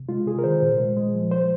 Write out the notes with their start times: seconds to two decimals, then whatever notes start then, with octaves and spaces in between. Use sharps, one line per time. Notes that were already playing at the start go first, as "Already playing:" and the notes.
Already playing: C3
0.09 G#3 F4
0.27 C3 G#4
0.39 A#4
0.44 D#3 C5
0.62 A#2
0.80 G#3
0.97 G#3
1.15 F3
1.31 C5